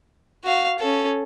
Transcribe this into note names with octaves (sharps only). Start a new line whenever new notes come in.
F#4 F5
C#4 A4